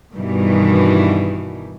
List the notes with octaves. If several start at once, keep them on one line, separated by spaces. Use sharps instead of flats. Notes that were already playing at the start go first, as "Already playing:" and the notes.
G2 B2 D#3 E3 G3